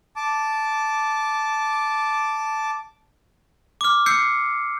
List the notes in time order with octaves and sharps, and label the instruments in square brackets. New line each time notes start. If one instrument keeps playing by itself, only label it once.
[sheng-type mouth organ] A5 D6
[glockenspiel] D6 F6
E6 G6 C7 C#7